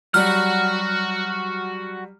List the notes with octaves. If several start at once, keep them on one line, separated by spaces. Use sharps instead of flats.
F#3 G3 F#4 F#5 F6